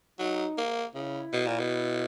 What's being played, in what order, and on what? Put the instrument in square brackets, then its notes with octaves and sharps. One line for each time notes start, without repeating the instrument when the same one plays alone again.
[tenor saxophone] F#3 [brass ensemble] D#4
[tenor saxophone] A#3
[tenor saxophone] C#3 [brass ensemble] E4
[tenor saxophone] B2
A#2
B2